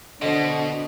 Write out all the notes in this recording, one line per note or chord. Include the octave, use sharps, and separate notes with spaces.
B2 D3 F3 B3 D4 D#5